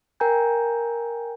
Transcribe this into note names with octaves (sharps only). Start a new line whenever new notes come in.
A#4 G5 G#5 A#5 G6